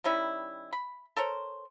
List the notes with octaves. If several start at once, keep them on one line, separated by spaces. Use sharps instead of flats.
D#3 G3 C#4 E4
B5
A4 A#4 C5 C#5